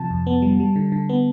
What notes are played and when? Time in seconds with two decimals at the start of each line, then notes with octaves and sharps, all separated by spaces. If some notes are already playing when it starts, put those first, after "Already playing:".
Already playing: C3 F3 A5
0.10 F2
0.27 B3
0.42 G3
0.60 G3
0.76 D3
0.92 D3
1.09 B3